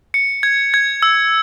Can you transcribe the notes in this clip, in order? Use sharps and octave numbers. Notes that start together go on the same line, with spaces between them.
C#7
G#6
G#6
E6